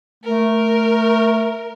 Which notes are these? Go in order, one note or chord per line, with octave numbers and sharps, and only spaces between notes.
A3 A#4